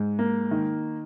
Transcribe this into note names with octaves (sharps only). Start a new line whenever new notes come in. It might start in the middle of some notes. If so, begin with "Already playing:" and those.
Already playing: G#2
A#3
D#3